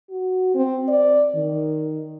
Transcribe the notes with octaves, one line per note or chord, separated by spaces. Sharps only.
F#4
C4
D5
D#3